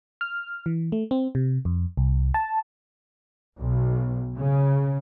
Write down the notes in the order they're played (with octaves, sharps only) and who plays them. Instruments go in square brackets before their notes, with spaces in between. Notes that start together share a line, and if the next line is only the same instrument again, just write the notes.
[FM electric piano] F6
E3
A3
C4
C3
F2
C2
A5
[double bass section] B1
C#3